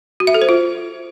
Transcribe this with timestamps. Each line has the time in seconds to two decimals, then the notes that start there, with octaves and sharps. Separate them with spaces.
0.20 F#4
0.27 E5
0.34 A4
0.42 C5
0.49 F4